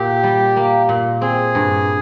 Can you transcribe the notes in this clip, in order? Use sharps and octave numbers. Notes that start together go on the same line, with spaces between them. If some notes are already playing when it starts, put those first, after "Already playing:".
Already playing: A#2 G4
G3
A#3
A#2
C4 G#4
G2